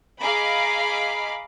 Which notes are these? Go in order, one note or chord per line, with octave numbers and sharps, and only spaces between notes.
G#4 D#5 F5 A#5 B5 D6